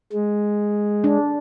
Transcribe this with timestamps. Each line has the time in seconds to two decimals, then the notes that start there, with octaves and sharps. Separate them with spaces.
0.12 G#3
1.04 D4